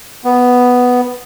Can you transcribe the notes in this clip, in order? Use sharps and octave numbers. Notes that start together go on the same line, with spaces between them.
B3